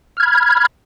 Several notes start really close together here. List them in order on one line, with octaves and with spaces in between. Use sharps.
F6 G#6 B5